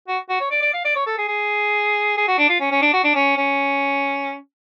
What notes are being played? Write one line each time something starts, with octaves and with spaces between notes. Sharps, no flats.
F#4
F#4
C#5
D5
D5
F5
D5
C#5
A4
G#4
G#4
G#4
F#4
D4
F4
C#4
C#4
D4
F#4
D4
C#4
C#4